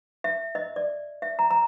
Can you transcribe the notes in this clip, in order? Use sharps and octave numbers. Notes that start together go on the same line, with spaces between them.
E5
D#5
D5
E5
A#5
A#5